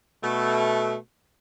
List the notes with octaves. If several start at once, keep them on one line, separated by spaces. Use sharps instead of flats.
B2 A3